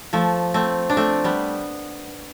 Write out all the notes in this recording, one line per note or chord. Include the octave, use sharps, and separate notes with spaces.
F3 A3
A3 C4
D4
A3 C4
G3 B3